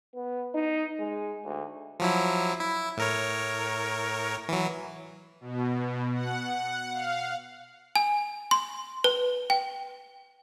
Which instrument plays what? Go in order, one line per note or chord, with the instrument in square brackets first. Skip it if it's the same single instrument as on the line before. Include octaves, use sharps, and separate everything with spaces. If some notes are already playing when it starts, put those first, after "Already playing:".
[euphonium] B3
D#4
G#3
D2
[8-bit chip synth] F3 F#3 E4
E4
A2 A#4 C#5
E3 F#3
[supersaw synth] B2
F#5
F5
[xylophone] G#5
C6
B4
G5